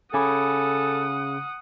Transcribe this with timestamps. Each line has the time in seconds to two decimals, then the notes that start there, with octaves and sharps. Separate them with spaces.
0.14 C#3 A4 F#5 G#5 B5 D6 D#6